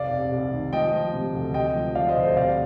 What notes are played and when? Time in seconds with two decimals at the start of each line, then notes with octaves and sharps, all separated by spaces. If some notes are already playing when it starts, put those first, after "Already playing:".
Already playing: C2 F2 D5 F5
0.11 C2
0.32 C2
0.52 D#3
0.73 F3 D#5 G5
0.93 F3
1.13 C3
1.33 D2
1.54 C3 D#5 G5
1.75 F3
1.95 F3 D5 F5
2.09 C5 D#5
2.17 D2
2.23 C5
2.37 C3 D5 F5